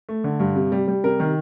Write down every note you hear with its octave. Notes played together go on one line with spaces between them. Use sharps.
A3
D3
G2
C3
G3
G3
C3 A#4
D#3